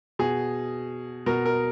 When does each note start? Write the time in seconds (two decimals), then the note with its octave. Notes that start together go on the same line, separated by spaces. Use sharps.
0.19 B2 G#4
1.26 B2 A#4
1.46 A#4